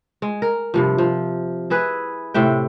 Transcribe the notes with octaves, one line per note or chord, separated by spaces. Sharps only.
G#3
A#4
G2 C3 F3
F3
E4 G#4 B4
A2 C3 E5 G5